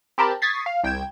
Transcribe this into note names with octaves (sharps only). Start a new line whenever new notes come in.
C4 G4 A#4 A5 B5
C#6 D#6 G#6 A6 B6 C7
F5
C2 G5 G6 G#6 E7